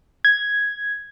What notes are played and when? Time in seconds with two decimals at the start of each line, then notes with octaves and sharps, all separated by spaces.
0.25 G#6